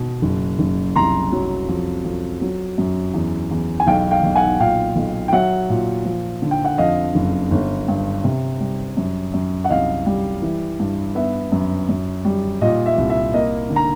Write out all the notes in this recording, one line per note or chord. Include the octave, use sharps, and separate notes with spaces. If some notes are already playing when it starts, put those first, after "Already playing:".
Already playing: B2
F#1
F#1
C2 A#5 C6
F#3
F2
F2
F#3
F#2
E2
E2
G#5
B1 F5 G5
F5 G5
B1
F#5 G#5
A#2 F5 G5
B1
G5
F#3 E5 F#5
A#2
F3
D3
G5
F#5
F2 D#5 F5
F#1
G1
G2
C3
G3
F#2
F#2
F#5
C2 D#5 F5
G3
E3
G2
B3 E5
F#2
F#2
G3
A#2 D#5
E5
C2
E5
A#3 D#5
D3
A#5